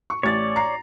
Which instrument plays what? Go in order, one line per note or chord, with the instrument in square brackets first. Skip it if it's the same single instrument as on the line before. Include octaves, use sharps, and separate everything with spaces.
[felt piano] C#6
[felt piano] A1 A6 [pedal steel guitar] C#5 D5
[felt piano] A#5 C7